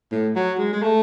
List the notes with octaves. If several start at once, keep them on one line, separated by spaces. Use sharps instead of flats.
A2
F#3
G#3
G#3
A3